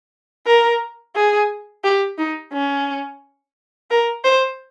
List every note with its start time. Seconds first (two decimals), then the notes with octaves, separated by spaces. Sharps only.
0.46 A#4
1.16 G#4
1.84 G4
2.18 D#4
2.53 C#4
3.91 A#4
4.25 C5